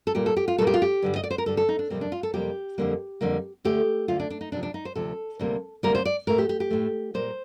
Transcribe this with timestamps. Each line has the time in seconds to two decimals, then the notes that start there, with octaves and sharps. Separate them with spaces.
0.07 A4
0.15 A#2 G3 A#3 G4
0.26 A4
0.36 G4
0.48 F4
0.58 A#2 G3 A#3 A4
0.67 G4
0.74 F4
0.82 G4
1.02 G2 D3 G3
1.16 D#5
1.23 D5
1.31 C5
1.38 A#4
1.46 G2 D3 G3 A4
1.57 A4
1.69 D#4
1.79 D4
1.90 F2 C3 G3 A#3 C4
2.01 D4
2.12 F4
2.23 A4
2.34 F2 C3 G3 A#3 G4
2.78 F2 D3 G3 A#3
3.21 F2 D3 G3 A#3
3.65 D2 D3 A3 G4
4.08 D2 D3 A3 F4
4.20 D4
4.30 D4
4.41 D#4
4.52 D2 C3 F3 D4
4.63 D4
4.74 D#4
4.85 C5
4.96 D2 C3 F3 A4
5.39 D2 C3 G3 A#3
5.83 D2 C3 G3 A#3 A#4
5.95 C5
6.05 D5
6.27 A2 A3 A#4
6.38 G4
6.49 G4
6.60 G4
6.71 A2 A3
7.14 A#2 G3 A#3 C5